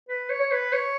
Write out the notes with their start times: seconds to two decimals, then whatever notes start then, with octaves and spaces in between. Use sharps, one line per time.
0.09 B4
0.30 C#5
0.40 C#5
0.51 B4
0.73 C#5